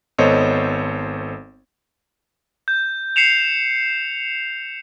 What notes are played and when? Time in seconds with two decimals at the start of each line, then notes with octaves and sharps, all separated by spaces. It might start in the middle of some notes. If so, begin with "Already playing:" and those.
0.18 G#1 B3 A4 C5 C#5 D#5
2.68 G6
3.16 C7 C#7 E7 F7